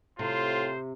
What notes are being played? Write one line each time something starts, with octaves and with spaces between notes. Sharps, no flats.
A2 C3 F4 C5